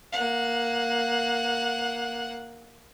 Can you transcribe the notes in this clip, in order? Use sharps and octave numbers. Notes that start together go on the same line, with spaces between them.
A#3 F#5